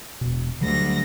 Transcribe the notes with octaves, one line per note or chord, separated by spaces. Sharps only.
E1 B2
D2 D3 F#3 G3 A#6